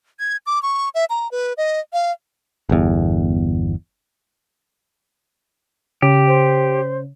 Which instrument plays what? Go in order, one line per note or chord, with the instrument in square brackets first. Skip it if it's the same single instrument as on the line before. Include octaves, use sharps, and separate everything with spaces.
[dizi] G#6
D6
C#6
E5
A#5
B4
D#5
F5
[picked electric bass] G1 E2
[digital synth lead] C#3 [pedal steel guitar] G4
[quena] C5